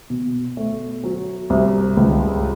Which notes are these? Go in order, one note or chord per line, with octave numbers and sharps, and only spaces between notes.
B2
A3
F#3
C2
C#2